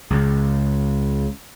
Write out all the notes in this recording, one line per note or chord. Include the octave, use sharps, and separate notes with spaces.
C#2